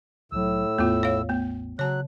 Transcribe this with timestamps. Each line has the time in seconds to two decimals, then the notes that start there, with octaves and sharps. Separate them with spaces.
0.32 C2 A2 F#3 E6
0.78 A1 E2 A3 B3 F4
1.03 C#5 F5
1.29 A3 B3
1.79 C#3 F#3 C#5 A5 F#6